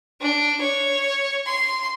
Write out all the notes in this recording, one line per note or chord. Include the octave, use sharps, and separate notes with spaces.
D4
C#5
C6